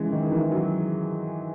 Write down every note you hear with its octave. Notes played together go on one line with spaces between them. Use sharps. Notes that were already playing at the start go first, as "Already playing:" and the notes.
Already playing: C#3 E3 G#3
D#3
E3
F#3